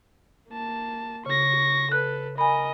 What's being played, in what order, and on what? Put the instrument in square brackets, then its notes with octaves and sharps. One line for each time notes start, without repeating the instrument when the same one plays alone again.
[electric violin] A#3 A5
[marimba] C#3 [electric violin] C#6 A#6
[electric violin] A4 B4 [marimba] F#6
[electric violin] A#4 D#5 [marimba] G#5 B5